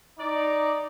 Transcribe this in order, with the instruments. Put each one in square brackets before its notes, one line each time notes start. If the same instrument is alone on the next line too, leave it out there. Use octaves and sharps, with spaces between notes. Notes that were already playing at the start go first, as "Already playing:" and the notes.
[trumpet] D#4 [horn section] D5